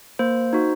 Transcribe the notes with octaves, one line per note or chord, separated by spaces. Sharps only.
A#3 C5
D#4 F#4